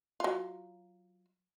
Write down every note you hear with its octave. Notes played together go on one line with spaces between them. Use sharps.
F#3 F4